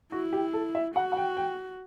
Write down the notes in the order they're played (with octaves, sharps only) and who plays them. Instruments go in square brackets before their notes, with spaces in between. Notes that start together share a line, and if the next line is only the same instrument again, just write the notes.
[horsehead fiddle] E4 [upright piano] F#4
[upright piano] G4
A4
E5
[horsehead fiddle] F#4 [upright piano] F#5
[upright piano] F#5
G5
G5